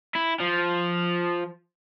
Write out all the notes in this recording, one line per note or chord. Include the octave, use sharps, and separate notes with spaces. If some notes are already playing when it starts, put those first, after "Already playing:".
E4
F3